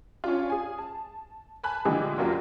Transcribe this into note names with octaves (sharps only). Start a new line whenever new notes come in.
C#4 D4 F4
G#4 G#5
A5
G#5 A5 B5 F#6
A#2 D3 E3 G#3 G4 G#4
F#1 F#3 A#3 F4 G4